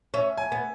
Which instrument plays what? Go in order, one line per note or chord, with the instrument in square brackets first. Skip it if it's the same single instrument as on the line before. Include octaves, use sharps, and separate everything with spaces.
[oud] C#4 [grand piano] E5
[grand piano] G#5
[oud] B3